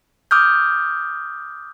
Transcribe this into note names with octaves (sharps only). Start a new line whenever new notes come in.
D6 D#6 F6 G6